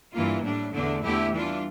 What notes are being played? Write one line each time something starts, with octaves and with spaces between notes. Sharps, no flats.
G2 E3 A#3 F4
A2 G3 D4
E2 D3 A3 D4
E2 D3 A3 E4 G4
E3 G3 D4 F4